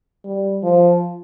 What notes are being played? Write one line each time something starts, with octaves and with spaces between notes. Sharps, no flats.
G3
F3